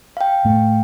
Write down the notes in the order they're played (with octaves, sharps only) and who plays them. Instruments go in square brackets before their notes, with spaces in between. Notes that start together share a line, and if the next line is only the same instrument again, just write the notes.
[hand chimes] F5 G5
[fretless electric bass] A2 A3